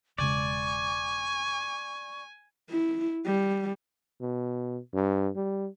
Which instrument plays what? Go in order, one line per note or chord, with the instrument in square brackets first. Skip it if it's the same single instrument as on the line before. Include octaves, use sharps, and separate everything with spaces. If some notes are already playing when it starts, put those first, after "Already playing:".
[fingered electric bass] E1 C#3 G#3 [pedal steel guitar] D5 [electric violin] G#5 [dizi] C#6
[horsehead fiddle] E4
G3
[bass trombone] B2
G2
G3